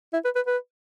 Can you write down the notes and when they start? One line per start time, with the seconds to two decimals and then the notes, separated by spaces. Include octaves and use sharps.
0.13 E4
0.24 B4
0.36 B4
0.47 B4